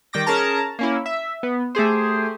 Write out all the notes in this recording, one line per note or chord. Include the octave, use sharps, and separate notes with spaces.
D#3 G3 G5 D6 A#6
C#4 G#4 A#4 A5 A#5
A#3 C#4 E4
E5
B3
A3 G4 G#4 C5